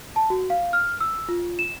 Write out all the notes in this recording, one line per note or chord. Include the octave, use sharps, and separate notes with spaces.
A5
F#4
F5
F6
E6
F4
E7